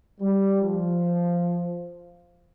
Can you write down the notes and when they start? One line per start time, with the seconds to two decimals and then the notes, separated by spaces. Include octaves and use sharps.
0.20 G3
0.62 F3